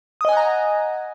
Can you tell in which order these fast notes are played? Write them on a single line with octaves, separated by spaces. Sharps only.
D#6 D#5 G#5 F#5 A#5